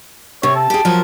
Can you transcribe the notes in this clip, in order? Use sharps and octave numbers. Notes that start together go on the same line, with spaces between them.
C3 C#5
A5
G4 G#4
F3 F#3 A#4